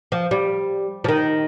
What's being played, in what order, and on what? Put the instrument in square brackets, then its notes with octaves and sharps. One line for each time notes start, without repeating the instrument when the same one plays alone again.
[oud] F3
G3
F3
D#3